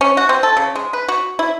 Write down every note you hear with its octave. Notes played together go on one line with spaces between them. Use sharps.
C#4
F#4
C4
A4
C#3
G#3
B4
F#4
E4